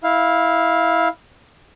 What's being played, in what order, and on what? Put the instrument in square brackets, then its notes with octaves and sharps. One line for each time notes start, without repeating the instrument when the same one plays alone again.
[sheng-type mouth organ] E4 F5